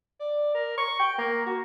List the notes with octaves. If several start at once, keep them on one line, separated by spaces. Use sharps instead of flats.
D5
A#4
C#6
G5
A#3
F#4